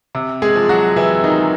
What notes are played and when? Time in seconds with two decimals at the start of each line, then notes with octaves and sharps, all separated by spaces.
0.15 C3
0.42 G#3 G#4
0.56 F3
0.69 F#3 F#4
0.96 C3 E3 E4
1.24 D#3 D#4
1.37 G#3